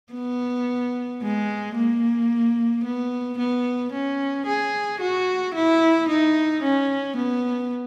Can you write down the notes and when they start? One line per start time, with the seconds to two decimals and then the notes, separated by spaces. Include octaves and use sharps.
0.13 B3
1.22 G#3
1.75 A#3
2.84 B3
3.38 B3
3.92 C#4
4.46 G#4
5.00 F#4
5.55 E4
6.08 D#4
6.63 C#4
7.16 B3